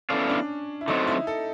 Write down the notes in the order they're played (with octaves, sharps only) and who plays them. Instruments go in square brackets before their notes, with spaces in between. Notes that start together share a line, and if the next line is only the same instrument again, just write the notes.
[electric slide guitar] B3 E4 A4 D5 F5 [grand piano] C#4
[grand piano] D4
E4
[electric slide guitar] D3 F#3 A3 C4 [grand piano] D#4
[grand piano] E4
A4